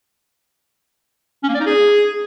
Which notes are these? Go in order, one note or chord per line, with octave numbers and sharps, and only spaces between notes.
C#4
A#3
D5
D#4
G#4